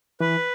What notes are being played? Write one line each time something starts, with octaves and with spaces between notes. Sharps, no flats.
E3 B4